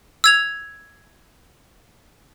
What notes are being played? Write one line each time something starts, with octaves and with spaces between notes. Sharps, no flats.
E6 G#6 F7